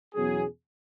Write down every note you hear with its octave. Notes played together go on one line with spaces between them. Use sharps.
E2 B2 F#3 C#4 G#4